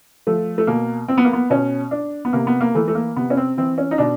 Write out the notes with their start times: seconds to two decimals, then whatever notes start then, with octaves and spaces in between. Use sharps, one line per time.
0.27 F3 A3
0.58 A3
0.67 B2 A#3
1.08 C4
1.18 B3
1.24 A#3
1.33 B3
1.50 B2 C#4
1.91 D4
2.25 B3
2.33 C3 A#3
2.47 B3
2.61 A#3
2.75 E3 A3
2.88 A3
2.95 A#3
3.16 C3 B3
3.30 C#4
3.37 C4
3.57 E3 C4
3.78 C#4
3.91 D#4
3.98 B2 D4